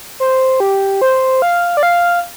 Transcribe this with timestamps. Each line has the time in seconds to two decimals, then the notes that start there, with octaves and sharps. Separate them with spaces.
0.20 C5
0.60 G4
1.01 C5
1.42 F5
1.77 D5
1.83 F5